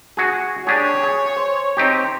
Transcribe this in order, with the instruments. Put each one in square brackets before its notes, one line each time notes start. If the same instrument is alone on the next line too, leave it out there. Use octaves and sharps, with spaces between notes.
[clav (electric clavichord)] F#4 G#4
[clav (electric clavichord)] D4 G4 G#4 [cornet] C#5
[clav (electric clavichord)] G#4
C5
C4 D#4 G4